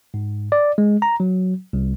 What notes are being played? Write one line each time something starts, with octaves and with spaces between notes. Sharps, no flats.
G#2
D5
G#3
A#5
F#3
C2